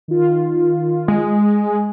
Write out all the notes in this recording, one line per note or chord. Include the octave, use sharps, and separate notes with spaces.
D#3 F4
G#3